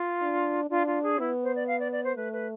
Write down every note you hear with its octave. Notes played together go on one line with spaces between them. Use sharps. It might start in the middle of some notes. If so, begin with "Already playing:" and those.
Already playing: F4
D4
D4 F4
F4
G#4
B3 E4
C5
D5
F5
D5
D5
C5
A3 B4
B4